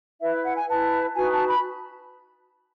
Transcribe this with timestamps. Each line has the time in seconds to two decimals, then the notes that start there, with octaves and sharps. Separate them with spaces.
0.21 E4 B4 E5
0.45 F#5
0.57 G#5
0.69 E4 B4 A5
1.16 D#4 F#4 B4 G#5
1.32 A5
1.48 B5